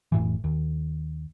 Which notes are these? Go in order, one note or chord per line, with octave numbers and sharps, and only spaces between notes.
F1 A2 E3
D#2